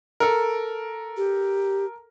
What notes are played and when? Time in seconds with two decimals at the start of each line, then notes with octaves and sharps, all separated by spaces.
0.20 A4 A#4
1.17 G4